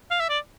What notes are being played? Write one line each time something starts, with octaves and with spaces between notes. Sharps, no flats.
F5
E5
D5